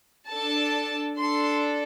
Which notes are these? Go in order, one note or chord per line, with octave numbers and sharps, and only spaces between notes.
D4 A4 A5
D4 A4 C6